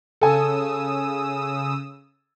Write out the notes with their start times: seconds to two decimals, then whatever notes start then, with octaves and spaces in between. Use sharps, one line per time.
0.21 C#3 A4 G#5 D#6 E6